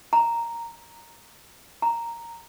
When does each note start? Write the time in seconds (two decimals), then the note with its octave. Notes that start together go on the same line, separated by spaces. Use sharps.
0.13 A#5
1.82 A#5